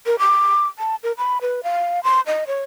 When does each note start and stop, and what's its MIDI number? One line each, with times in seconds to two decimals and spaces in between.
0.06 0.16 70
0.19 0.67 86
0.78 0.95 81
1.03 1.12 70
1.18 1.38 83
1.41 1.61 71
1.63 2.00 77
2.04 2.21 84
2.27 2.44 75
2.47 2.63 73